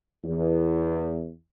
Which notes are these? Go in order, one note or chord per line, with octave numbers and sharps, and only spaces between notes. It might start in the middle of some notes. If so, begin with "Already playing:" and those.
E2